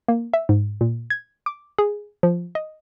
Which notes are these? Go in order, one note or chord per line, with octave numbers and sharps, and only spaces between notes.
A#3
E5
G#2
A#2
G#6
D6
G#4
F3
D#5